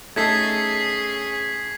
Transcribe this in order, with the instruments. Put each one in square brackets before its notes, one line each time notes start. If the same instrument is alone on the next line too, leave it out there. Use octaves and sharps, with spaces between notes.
[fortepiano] A3 D#4 A4 [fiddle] C#4 G#4 [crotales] G#6 B6 C7